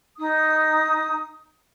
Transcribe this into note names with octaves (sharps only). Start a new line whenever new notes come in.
D#4 D#6